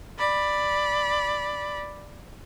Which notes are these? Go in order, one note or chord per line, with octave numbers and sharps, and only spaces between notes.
D5 B5